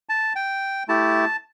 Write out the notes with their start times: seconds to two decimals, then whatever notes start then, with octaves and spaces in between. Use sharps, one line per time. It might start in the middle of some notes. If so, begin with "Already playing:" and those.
0.09 A5
0.36 G5
0.88 A3 E4 G4 A5